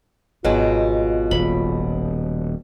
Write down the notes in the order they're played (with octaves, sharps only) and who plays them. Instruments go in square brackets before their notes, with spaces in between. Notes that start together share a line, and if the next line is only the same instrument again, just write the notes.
[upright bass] G#1 E4 [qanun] B2 F#3 G#3 [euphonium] F4
[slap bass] D#1 [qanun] B5